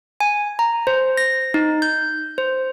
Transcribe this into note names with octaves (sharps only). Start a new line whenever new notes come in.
G#5
A#5
C5
A#6
D#4
G6
C5